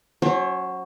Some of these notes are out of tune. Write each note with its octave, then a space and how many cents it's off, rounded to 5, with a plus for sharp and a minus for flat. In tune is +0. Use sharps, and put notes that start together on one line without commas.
F#3 +0 C#4 +5 C5 +40